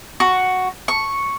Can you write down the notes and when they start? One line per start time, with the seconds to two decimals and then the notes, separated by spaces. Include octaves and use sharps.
0.20 F#4
0.88 C#6